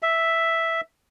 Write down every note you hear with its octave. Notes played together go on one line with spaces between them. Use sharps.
E5